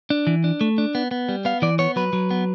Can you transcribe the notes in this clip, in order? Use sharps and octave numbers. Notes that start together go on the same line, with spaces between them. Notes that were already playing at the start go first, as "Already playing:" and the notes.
D4
E3
D4
A3
D4
B3
B3
G3
B3 F5
E3 D5
B3 C#5
F#3 B4
F#3
B3